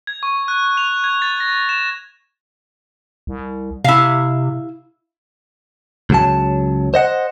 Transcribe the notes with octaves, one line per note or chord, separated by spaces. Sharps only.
G#6
C#6
F#6
F7
G#6
A6
A#6
E7
C2
C3 E4 F5
C#2 F#3 A5
C5 D#5 F#5